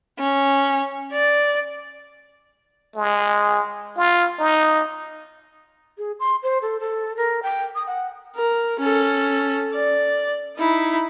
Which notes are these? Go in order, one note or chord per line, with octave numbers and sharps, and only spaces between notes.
C#4
D5
G#3
F4
D#4
G#4
C6
C5
A4
A4
A#4
G5
D#6
F#5
A#4
C#4 A4
D5
D#4 E4